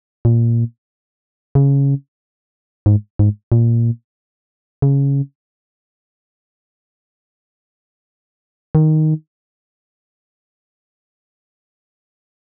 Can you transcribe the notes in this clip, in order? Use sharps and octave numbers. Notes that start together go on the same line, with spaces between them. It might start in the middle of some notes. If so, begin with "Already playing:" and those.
A#2
C#3
G#2
G#2
A#2
C#3
D#3